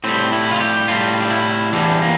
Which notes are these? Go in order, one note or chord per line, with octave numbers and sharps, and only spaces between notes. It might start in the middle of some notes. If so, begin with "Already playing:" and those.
A2 G3 C4
E4
F4
G4
A2 G3 F4
D4
E4
E2 E3 G3 D4
A#3